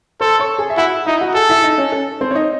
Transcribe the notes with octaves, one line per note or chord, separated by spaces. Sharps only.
A4 C5 C6
C#5 C#6
G#4 G#5
E5
E4 F#4 F#5
D#4 E4 E5
F#4 F#5
G#4 A4 G#5
E4 E5
D#4 D#5
C#4 C#5
A4
C4 C5
C#5
D#4 D#5